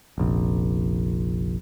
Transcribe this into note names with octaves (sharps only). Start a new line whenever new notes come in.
F1 A#1